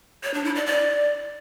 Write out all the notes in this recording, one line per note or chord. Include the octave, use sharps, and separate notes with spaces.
C#5
D4
E4
D5
D5